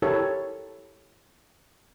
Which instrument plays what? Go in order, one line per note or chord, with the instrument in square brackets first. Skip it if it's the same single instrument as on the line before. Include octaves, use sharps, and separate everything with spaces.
[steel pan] E4 G4 A4 A#4 C#5